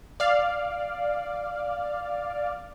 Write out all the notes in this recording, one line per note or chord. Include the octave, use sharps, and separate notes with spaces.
D5 F5